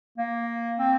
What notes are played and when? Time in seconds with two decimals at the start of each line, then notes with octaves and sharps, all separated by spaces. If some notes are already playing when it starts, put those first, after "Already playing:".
0.18 A#3
0.79 C4